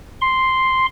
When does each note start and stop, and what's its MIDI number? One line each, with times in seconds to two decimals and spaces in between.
0.21 0.86 84